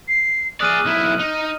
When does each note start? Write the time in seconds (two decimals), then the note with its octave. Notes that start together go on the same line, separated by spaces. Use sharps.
0.08 C7
0.61 G#4 D5 D#6 F6 F#6 D#7
0.85 B1 E4
1.20 D#4